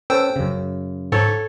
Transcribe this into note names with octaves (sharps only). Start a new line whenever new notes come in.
C#4 A4 B4 C5 G5 E6
F#2 C#3
G#2 A4 C#5